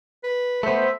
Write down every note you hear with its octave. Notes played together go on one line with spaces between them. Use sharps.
B4
A3 B3 C5 E5